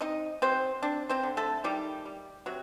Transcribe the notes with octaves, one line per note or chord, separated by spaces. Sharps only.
C4 D#4 D#5
F#3 C4 C5
C4 D4
C4 C5
D3
A3 A4
D#3 G3 G4
G3
C3 F#3 F#4